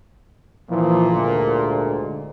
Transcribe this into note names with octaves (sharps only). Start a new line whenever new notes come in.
A#2 E3 F3
D2 G#2 D3